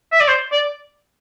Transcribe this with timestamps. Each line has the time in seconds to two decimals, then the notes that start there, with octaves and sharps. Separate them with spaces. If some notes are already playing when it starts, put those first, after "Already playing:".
0.12 E5
0.20 D5
0.28 C5
0.52 D5